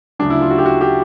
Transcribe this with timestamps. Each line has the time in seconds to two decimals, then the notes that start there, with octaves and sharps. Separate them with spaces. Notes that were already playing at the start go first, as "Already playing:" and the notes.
0.19 D2 C#3 F#3 D4
0.30 E4
0.41 F4
0.51 F#4
0.58 G4
0.66 F#4
0.81 G4